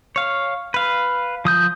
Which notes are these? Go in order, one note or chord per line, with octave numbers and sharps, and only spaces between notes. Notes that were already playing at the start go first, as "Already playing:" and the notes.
C#5 F5
B4 F5
F3 D#6 G6